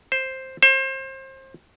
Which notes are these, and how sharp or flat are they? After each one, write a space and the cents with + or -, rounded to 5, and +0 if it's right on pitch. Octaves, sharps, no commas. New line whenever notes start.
C5 +5
C5 +30